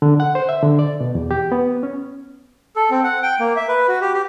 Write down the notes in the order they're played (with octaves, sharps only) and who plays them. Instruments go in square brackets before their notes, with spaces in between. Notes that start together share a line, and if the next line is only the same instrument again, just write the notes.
[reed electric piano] D3
F#5
C5
E5
D3
D5
B2
E2
G4
B3
C#4
[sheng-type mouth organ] A4
C4
F#5
G5
A#3
E5
B4
F#4
G4
G4